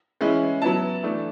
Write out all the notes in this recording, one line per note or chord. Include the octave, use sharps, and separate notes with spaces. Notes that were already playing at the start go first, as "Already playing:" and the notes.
E3 G#3 C#4 E4
F#3 B3 E4 A5
E3 A3 D4